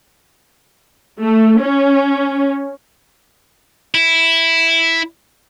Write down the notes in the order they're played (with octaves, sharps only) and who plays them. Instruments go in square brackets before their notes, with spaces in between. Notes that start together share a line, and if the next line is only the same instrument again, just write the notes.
[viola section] A3
C#4
[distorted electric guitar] E4